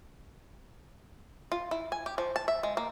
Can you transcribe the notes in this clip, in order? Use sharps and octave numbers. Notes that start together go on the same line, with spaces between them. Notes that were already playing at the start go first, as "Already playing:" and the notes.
F4
E4
G#5
G4
F3
A5
E5
G#3
A#3